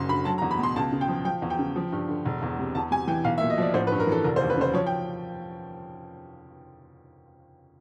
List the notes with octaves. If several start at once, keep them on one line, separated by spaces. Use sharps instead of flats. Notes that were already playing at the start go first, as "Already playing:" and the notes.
Already playing: F#1 F#2 C6
D3 B5
F#3 A5
A#5
E2
B5
B2 C6
C#2 A5
C#3
G5
F3
F3 G5
E2
G5
C#3
F3
G2
D3
E1
E2
C3
E2 A5
C3 G#5
E3 G5
B1 F5
E5
A#2
D#5
F3 D5
A1 C5
B4
G2
A#4
E3 A4
F1 A#4
C5
D#2
B4
C#3 C5
F3 C#5
G5